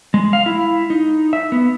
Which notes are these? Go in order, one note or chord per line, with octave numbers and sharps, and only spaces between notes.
G#3
F5
E4
D#4
E5
B3